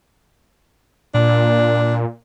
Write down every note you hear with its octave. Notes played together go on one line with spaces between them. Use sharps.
A#2 D4